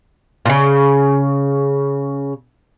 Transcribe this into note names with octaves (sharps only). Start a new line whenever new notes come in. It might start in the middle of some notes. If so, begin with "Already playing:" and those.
A#2 C#3